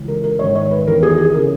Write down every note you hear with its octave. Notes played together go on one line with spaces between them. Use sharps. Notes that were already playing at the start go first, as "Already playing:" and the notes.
Already playing: C#2 C#3 E3
A#4
A#4
G#2 D#3 C#5
C#5
B4
E2 D#3 A#4
G#4
G#4
C#3 E3 A#4